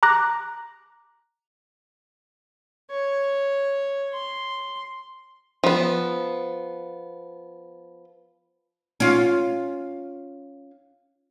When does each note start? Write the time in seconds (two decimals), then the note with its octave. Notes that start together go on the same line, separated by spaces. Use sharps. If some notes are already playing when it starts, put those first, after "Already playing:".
0.03 A#5 D6 F#6 A#6
2.91 C#5
4.13 C6
5.64 F3 B3
9.00 C#4 F4